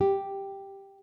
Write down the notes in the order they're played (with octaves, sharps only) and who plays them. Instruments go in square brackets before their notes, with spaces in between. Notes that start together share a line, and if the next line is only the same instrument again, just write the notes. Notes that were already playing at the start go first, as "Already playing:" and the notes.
[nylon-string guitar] G4